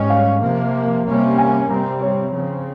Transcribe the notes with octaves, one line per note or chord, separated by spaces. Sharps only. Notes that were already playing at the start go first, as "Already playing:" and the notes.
Already playing: G#2 G3 C#4 D#5
F5
C3 F3 A#3
C3 G3 A#3 C#4
G#5
C3 G3 C4 A#5
C#5
C#3 F3 C4